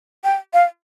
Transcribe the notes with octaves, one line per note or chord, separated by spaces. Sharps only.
G5
F5